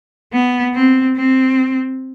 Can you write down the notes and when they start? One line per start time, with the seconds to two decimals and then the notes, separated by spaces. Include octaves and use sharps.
0.33 B3
0.75 C4
1.17 C4